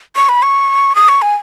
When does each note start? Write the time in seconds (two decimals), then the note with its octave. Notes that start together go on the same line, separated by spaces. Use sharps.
0.16 C#6
0.29 B5
0.43 C#6
0.95 D#6
1.09 C#6
1.22 G#5